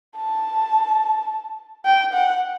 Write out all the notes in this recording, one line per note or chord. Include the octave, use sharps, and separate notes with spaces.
A5
G5
F#5